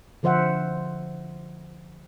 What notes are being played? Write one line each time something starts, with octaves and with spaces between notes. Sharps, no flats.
D3 F3 C5 E5 F#5